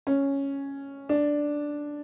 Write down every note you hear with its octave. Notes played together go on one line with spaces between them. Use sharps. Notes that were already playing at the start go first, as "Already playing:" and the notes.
C#4
D4